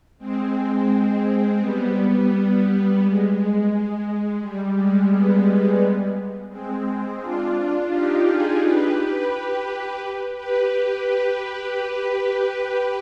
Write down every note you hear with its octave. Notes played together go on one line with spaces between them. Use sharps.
G#3 C4
G3 B3
G#3
G3
G#3
G3 B3
G#3 C4
G#3
D4 F4
D#4 G4
F4 G#4
G4 B4
G4 B4
G4 B4
G4 B4